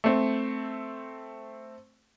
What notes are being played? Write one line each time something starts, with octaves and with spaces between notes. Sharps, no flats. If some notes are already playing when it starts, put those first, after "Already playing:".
A3 C4